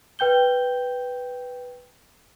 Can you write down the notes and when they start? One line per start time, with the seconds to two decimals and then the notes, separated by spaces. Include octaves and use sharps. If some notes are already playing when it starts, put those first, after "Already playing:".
0.19 B4 G5 G6 G7